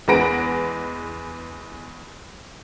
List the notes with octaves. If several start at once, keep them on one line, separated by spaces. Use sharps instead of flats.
E2 G#3 B4 A#6 D7